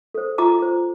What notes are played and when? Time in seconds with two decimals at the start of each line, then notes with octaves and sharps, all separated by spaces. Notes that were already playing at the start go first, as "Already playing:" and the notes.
0.14 A4 C5
0.38 F4 A#5 D6
0.62 C5